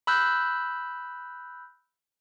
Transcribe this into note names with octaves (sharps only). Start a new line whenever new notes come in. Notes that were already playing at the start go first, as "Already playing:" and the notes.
B5 E6 F#6 G6